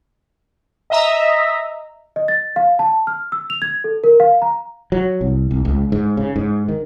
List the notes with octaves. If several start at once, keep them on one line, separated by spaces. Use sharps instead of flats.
D#5 E5 A#5
D#5
A6
F5
A5
F6
E6
F7
G#6
A4
A#4
F5
A#5
F#3
C2
C2
C#2
G#2
C#3
G#2
D#3